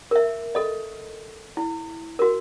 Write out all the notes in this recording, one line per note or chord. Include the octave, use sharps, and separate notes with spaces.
A#4 E5
A4 D#5
E4
F#4 A#4